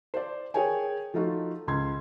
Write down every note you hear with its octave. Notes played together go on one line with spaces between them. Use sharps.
C5 D5
G#4 A#4 C#5 G5 G#5
F3 A3 D#4 F4 F#4
C#2 C6 G#6